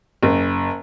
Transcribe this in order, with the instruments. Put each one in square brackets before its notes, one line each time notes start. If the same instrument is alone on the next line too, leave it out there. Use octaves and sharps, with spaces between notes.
[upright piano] F#1